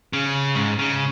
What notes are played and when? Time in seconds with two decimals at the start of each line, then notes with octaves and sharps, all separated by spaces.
0.13 C#3
0.55 G#2
0.79 C#3